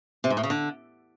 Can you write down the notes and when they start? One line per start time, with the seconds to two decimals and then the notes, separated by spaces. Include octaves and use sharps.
0.24 C3
0.30 G#2
0.37 A2
0.43 C#3
0.50 D3